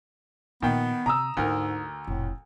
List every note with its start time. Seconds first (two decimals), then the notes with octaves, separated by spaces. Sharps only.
0.62 A#2 D#3 F3 B3 G5
1.06 C3 A#5 D#6 E6
1.37 D2 G#2 D4 E4 A#4
2.07 F1 A#1 A2